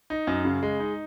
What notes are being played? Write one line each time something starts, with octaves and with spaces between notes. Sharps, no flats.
D#4
F#2
C#3
G#3
D#4